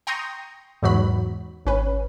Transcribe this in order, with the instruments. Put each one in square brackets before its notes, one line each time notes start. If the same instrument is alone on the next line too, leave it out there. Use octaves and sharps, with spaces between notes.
[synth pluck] G5 A#5 C6 C#6 D#6 G6
E2 G#2 F#3 F#4 B5
G#1 C#4 B4